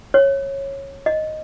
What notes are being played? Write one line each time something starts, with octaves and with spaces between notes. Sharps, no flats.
C#5
D#5